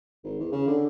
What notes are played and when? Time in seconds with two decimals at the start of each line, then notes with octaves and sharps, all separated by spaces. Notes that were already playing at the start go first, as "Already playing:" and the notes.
0.24 G#1
0.39 E2
0.52 C#3
0.67 D3